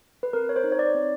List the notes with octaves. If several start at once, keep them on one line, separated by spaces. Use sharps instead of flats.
B4
C4 A#4
C#5
C5
D#4
C#5
D5
C4